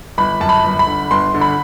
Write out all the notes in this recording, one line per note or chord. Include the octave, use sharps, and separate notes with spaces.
G1 B5
F#2 A5
B5
G1
B5
D3
G1 C6
D3
B5